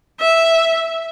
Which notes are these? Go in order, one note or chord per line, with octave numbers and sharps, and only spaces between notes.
E5